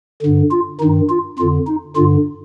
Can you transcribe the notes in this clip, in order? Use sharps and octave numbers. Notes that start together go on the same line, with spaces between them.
G2 D3
F4
G2 D#3 D#4
F4
F2 D3 F4
D#4
G2 D3 F4